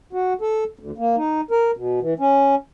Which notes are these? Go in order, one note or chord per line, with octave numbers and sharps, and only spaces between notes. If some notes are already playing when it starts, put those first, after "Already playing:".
F#4
A4
D2
A#3
D#4
A#4
B2
E3
C#4